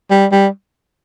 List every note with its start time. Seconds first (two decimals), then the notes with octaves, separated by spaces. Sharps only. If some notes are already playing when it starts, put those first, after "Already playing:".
0.11 G3
0.32 G3